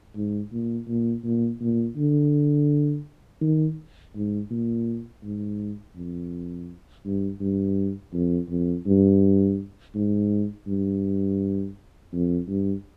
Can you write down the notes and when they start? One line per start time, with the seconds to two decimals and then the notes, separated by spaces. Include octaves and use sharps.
0.15 G#2
0.52 A#2
0.88 A#2
1.23 A#2
1.60 A#2
1.96 D3
3.41 D#3
4.15 G#2
4.50 A#2
5.23 G#2
5.95 F2
7.05 G2
7.40 G2
8.13 F2
8.49 F2
8.86 G2
9.94 G#2
10.67 G2
12.12 F2
12.48 G2